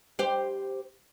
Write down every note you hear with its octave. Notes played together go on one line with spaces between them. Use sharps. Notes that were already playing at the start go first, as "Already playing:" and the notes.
G4 C5